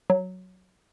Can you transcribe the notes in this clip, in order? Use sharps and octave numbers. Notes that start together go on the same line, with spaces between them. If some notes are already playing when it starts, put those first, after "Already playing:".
F#3